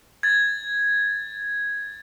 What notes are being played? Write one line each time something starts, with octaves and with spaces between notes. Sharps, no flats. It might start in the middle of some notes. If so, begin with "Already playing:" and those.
G#6 A6